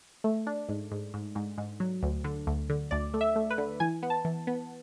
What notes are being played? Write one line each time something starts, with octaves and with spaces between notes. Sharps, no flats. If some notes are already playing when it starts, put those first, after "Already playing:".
A3
D4
G#2
G#2
G#2
G#2
G#2
F#3
D2
D3
D2
D3
D2 D5
A3
E5
A3
B4
D3
E3 G#5
B3
A5
E3
B3